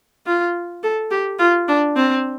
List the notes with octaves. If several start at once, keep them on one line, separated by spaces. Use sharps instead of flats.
F4
A4
G4
F4
D4
C4